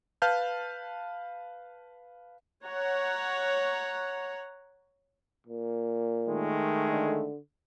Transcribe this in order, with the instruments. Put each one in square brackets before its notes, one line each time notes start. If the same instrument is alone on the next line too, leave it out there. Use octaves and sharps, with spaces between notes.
[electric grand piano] B4 F5 A5 F6 G6
[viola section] C#5 F#5 A#5
[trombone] A#2
[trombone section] D#3 G#3 A3
[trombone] D3